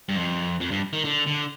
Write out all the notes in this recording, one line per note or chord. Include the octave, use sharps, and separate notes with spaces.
G2
F2
F2
G2
D#3
D3
D3